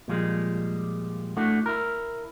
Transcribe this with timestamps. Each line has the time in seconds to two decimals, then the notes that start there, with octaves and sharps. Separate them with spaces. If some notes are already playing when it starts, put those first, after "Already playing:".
0.08 A#2 F3 G3 G#3
1.37 A2 A3 D4 F#4
1.66 E4 A#4